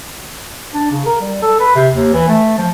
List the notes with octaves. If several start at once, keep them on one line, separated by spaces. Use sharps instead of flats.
D4
C#3
A#4
G3
A4
B4
C3
D#2
E3
A3
F3